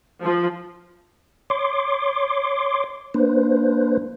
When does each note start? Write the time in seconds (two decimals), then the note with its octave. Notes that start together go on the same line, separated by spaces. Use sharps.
0.23 F3
1.50 C#5 C6 D6
3.14 A#3 D4 B4 C5